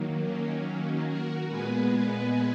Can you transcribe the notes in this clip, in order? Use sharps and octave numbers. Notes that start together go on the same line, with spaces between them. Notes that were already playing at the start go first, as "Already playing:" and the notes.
Already playing: D#3 F#3 A#3
C#4
F#4 A#4
A#2 G#3 B3 G#4 B4